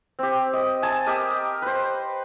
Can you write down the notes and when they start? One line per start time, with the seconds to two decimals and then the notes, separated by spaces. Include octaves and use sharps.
0.19 C4 G4
0.53 D#5
0.82 G#5 A5 E6
1.07 G4 A#4 D#5
1.62 B4 C5